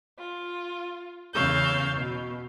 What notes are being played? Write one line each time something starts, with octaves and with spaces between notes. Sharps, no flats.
F4
E2 C#3 C#5 F5 E6 G6
B2